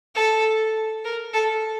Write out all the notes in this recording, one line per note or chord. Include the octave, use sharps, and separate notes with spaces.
A4
A#4
A4